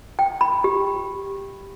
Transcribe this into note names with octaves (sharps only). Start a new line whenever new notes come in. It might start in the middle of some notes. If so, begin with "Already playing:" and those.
G5
B5
G4